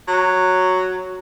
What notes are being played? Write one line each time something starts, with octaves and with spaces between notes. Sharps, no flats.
F#3